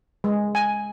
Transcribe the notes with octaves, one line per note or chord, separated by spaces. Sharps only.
G#3
G#5